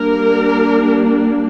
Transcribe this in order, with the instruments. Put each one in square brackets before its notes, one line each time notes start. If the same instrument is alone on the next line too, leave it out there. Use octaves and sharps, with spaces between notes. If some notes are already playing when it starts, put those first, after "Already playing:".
Already playing: [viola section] G3 A#3 D4 A#4